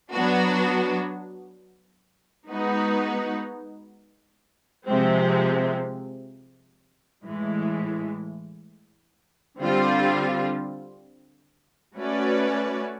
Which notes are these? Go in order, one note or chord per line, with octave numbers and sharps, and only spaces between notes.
F#3 B3 D4 F#4
G#3 B3 D#4 F#4 B4
C3 F3 G#3 C4
A2 E3 G#3
D3 G3 C4 F4
A3 C#4 F#4 B4 D5